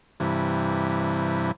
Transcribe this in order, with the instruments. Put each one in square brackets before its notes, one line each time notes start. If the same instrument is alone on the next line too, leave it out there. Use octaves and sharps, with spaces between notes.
[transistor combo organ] G2 C3 E3